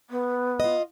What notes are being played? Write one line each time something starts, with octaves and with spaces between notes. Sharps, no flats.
B3
F4 D#5